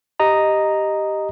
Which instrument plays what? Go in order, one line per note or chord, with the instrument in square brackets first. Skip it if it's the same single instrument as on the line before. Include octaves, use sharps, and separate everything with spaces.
[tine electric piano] G4 D#5 A#5